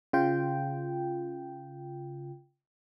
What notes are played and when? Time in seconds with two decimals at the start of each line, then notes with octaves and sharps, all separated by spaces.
0.13 C#3 F4 G5